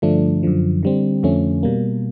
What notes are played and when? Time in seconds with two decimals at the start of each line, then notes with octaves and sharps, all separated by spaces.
0.02 G2 D3 F3 A3 D4
0.43 F#2 D3 F3
0.83 D3 G3 C4
1.23 F2 D3 F3 A3 C#4
1.63 B2 G3 A#3